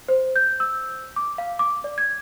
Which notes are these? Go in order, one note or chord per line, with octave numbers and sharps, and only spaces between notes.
C5
G6
E6
D6
F5
D6
D5
G#6